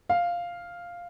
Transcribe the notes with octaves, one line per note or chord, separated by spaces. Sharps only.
F5